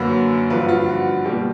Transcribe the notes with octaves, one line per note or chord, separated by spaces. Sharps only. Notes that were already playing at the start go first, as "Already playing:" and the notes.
Already playing: F#2 D3 F#3 A#3 B4
G2 D3 F3 B4
F#4
F4
F#4
F#4
B2 G3 A#3 G4